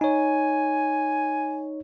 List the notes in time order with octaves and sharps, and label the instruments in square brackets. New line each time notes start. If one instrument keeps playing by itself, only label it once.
[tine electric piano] D#4 C#5 [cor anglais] G#5